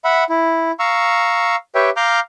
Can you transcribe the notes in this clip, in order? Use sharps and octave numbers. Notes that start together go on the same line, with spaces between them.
E5 F#5 B5
E4
F5 A#5 C#6 E6
G4 B4 C#5 E5 G5
F5 A#5 D6 F6 G6